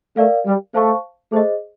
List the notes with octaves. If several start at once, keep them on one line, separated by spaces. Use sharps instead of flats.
A3 A#4 D5 F5
G3
A3 C5 F5 A5 C#6
A3 G#4 C5 D#5